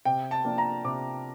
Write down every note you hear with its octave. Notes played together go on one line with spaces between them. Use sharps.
C3 G5
A5
F3 A#3 D4
A#5
C3 D6